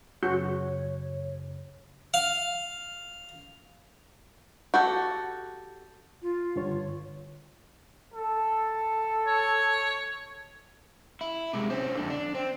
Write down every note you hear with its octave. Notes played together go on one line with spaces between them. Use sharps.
F#2 C#3 F#4 C#5
F5
F#4 G4 A4
F4
G2 D3 C#5
A4
C#5
E4
C3 G#3
C4 C#4
F2 D3
D4
C4